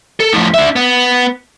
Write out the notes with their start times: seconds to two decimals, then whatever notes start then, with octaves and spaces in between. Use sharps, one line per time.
0.20 A4
0.33 A2 F3
0.54 D4 E5
0.76 B3